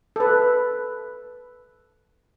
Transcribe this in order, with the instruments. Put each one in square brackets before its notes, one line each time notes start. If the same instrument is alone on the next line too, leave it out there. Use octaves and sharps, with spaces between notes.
[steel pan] A4 B4